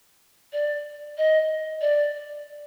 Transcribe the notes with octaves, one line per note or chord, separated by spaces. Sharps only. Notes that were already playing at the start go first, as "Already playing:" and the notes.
D5
D#5
D5